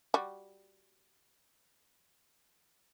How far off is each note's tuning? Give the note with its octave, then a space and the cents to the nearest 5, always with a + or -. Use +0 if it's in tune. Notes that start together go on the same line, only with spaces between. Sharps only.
G3 +0 F#4 +0